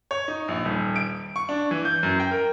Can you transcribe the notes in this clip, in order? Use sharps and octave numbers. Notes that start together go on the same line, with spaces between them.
C#5
D#4
A#1
D#1
D7
C#6
D4
E3
G6
F#2
G5
A#4